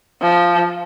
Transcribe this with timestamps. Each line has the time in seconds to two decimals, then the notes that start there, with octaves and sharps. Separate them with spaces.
0.22 F3